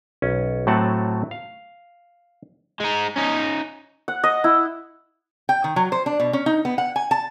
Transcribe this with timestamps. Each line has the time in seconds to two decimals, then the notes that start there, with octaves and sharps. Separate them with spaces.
0.22 B1 C#4
0.67 A2 F#3 A3 C4 F#5 A5
1.31 F5
2.80 G#3 D#4
3.16 C#4 D#4
4.08 F#5
4.24 D#5
4.44 E4
5.49 G5
5.64 D#3
5.76 F#3
5.92 C5
6.06 D4
6.20 B2
6.33 C#4
6.46 D#4
6.65 B3
6.78 F#5
6.96 G#5
7.11 A5